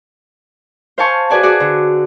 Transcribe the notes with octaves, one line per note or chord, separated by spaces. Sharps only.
C5 F5 G#5 A5 C#6
F#4 G#4 B4 D5 G#5 A5
F#4 G#4 D5
D3